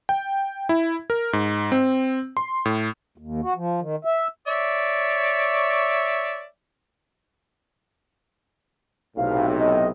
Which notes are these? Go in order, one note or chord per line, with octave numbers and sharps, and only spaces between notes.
G5
E4
A#4
G#2
C4
C6
A2
D#2
F#4
F3
D#3
E5
C#5 D5 E5
B1 A2 C3 F5
D#5